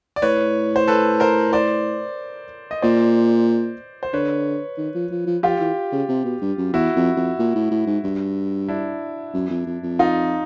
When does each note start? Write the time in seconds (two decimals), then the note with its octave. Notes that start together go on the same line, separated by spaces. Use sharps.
0.16 D5
0.22 A2 B4 C#5
0.76 C5
0.88 A4 B4
1.20 A#4 C5
1.53 C5 D5
2.71 D#5
2.82 A#2 C5 D5
4.03 C5
4.13 D3 B4 C#5
4.78 D#3
4.95 F3
5.11 F3
5.27 F3
5.43 F3 F4 G4
5.60 E3
5.92 C#3
6.09 C3
6.25 B2
6.41 G2
6.58 F#2
6.73 E2 E4 F#4
6.96 F2
7.16 F2
7.39 A#2
7.55 A2
7.71 A2
7.87 G#2
8.04 G2
8.68 D4 E4
9.34 F#2
9.50 F2
9.67 F2
9.83 F2
9.99 D#4 F4